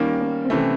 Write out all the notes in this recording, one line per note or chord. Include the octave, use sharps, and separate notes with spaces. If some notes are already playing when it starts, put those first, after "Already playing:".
Already playing: D#3 G3 A#3 C#4
C#4
C4
C3 E3 A3 C#4